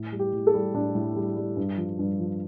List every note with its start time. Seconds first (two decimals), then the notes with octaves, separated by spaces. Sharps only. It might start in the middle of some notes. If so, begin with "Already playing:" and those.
Already playing: A2
0.12 G3
0.19 G4
0.33 A2
0.47 A4
0.54 G3
0.74 A2 D4
0.95 A2
1.16 G3
1.36 G3
1.57 G2
1.77 F3
1.99 G2
2.19 F3